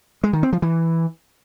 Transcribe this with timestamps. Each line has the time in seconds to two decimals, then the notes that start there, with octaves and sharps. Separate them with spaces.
0.24 G#3
0.33 D#3
0.43 C4
0.53 F3
0.62 E3